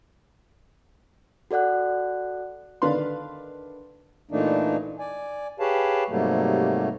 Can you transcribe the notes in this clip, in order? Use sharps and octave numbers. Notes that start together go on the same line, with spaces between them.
F#4 A4 D5 F#5 F#6
D3 D#3 D4 B4 F5 C6
A#2 E3 A3 A#3 D4 D#4
D5 G#5
G4 G#4 B4 C#5 F5 A5
G#2 C3 F#3 G3 A3 A#3